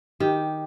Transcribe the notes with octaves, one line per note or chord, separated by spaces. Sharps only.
D#3 G4